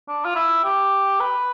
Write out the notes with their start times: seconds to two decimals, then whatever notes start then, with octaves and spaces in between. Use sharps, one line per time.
0.08 D4
0.25 F4
0.35 E4
0.64 G4
1.20 B4